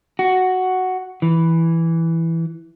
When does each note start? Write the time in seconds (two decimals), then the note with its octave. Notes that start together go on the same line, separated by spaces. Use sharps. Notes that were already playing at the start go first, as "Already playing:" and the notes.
0.19 F#4
1.22 E3